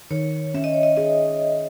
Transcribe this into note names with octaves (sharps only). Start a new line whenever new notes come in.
D#3 C#5
C#4 E5
D#5
C#5
D#5
G#4 D#5